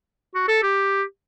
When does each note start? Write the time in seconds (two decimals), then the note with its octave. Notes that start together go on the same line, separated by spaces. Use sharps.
0.35 F#4
0.48 A4
0.63 G4